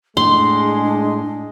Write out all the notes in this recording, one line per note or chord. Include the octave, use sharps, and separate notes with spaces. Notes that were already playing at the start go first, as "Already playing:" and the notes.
A2 G#3 D4 C6